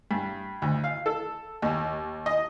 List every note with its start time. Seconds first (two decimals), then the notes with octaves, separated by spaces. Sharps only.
0.11 G2
0.62 D2
0.84 F5
1.06 A4
1.62 D#2
2.26 D#5